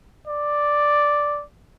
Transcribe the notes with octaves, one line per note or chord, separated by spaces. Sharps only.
D5